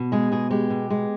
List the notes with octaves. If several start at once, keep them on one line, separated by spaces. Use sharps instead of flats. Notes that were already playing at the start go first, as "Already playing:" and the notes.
Already playing: B2
G#3 G#4
B2 G#4
G#3 G4
B2
G#3